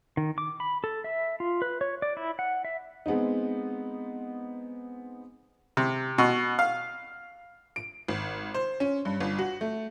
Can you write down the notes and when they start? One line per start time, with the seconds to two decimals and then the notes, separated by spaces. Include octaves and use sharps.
0.17 D#3
0.38 D6
0.60 B5
0.84 A4
1.04 E5
1.40 F4
1.62 B4
1.81 C#5
2.02 D5
2.17 E4
2.39 F#5
2.65 E5
3.06 G#3 B3 C4 D#4
5.77 C3
6.18 B2
6.59 F5
7.76 D7
8.08 G#1
8.54 C5
8.80 C#4
9.05 G2
9.20 G1
9.38 F#4
9.61 A3